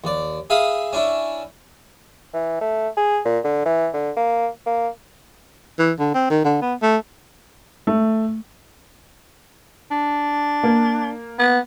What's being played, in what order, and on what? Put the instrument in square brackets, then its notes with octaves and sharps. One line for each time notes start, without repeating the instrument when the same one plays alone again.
[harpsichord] D#2 D5
G#4 E5 F5 B5 D#6
C#4 D4 E4
[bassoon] E3
A3
G#4
A#2
D3
E3
D3
A#3
A#3
[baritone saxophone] E3
D3
C4
D#3
D3
B3
A3
[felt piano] A3
[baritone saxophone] D4
[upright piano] A#3
[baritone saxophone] B3